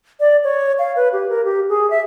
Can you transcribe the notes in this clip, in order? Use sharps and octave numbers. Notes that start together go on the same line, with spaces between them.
D5
C#5
F5
B4
G4
A#4
G4
G#4
E5